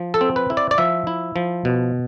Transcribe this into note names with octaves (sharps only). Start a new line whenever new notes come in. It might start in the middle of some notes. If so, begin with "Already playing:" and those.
Already playing: F3
A4
C4
B4
E4
D5
D5
F3 E5
E4
F3
B2